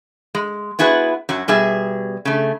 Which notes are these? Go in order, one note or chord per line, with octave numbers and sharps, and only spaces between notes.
G#3
B3 E4 F#4 G#4 B4
F#2 F#3 F#5
B2 G3 B3 G#4 E5
C#3 A3